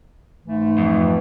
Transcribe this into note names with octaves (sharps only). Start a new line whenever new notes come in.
G#2 E3 A3
F2